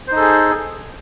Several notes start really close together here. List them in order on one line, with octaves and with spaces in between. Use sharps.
C5 D#4 A4 G#4